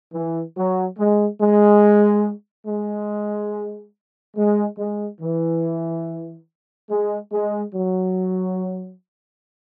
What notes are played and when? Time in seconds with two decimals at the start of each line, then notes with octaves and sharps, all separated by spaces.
0.13 E3
0.56 F#3
0.98 G#3
1.41 G#3
2.67 G#3
4.37 G#3
4.78 G#3
5.21 E3
6.90 G#3
7.33 G#3
7.75 F#3